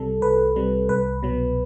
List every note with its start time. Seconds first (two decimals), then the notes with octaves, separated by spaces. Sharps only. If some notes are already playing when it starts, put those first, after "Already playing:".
Already playing: C2 C3 G3 A4
0.21 C2 B4
0.56 C3 G3
0.89 C2 B4
1.23 B2 F#3